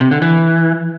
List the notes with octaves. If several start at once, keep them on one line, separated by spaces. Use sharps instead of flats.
C3
D3
E3